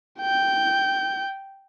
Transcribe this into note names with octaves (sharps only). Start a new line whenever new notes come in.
G5 G6